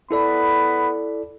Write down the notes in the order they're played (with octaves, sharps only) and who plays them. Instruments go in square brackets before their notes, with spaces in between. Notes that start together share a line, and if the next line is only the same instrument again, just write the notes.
[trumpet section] B3 B5 [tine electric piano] E4 A4 D5